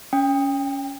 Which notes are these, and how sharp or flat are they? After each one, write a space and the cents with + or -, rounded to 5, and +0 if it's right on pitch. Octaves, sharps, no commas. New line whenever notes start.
C#4 +15 G5 +30